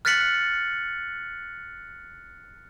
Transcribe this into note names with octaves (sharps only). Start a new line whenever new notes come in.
F6 F#6 A6 B6 C#7 F#7